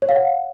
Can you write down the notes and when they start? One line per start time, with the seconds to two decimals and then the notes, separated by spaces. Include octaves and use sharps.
0.02 C#5
0.09 F5
0.15 F#5